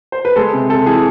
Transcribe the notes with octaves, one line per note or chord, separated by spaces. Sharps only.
C5
B4
G#3 A4
C3
C3 A4
E3 G#4